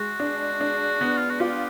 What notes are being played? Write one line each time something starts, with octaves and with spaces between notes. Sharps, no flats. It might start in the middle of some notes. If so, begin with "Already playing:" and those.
Already playing: G#3 F#4
D4
D4
B3
F4
F#4
F4 G4